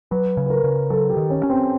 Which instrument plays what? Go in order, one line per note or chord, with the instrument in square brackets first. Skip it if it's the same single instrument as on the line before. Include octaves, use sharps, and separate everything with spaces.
[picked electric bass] F#3 [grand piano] B4
[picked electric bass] C#3
[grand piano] B4
A#4
[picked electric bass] C#3
[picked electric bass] F#3 [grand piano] A4
[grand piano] G4
[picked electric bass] D#3
[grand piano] C#4
[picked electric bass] C#4
[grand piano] C4